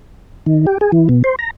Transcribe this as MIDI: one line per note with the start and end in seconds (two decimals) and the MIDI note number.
0.46 0.66 51
0.67 0.78 67
0.81 0.91 68
0.92 1.08 52
1.09 1.22 47
1.24 1.36 72
1.39 1.50 82